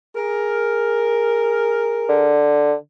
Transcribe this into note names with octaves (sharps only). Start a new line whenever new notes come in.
G#4 A#4
D3